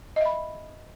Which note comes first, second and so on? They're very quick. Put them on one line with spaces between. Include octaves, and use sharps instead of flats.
D#5 E5 B5